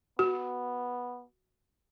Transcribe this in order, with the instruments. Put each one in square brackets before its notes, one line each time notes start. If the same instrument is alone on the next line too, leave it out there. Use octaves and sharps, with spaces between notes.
[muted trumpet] B3 [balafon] F#4